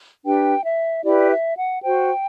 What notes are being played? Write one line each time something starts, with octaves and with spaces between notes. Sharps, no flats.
D4 G4 B4 G5
E5
E4 G4 B4 D5
E5
F#5
F#4 C5 G5